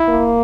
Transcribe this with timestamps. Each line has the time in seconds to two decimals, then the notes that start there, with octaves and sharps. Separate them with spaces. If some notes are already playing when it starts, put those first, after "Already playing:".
Already playing: E4
0.09 A#3